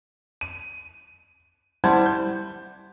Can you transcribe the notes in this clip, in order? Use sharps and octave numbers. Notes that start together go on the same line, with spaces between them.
D#7
G3 E4 C5 F#5 A5 G#6
G6